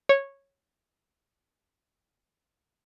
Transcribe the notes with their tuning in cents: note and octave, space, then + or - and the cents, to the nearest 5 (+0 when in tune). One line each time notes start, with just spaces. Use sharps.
C#5 -10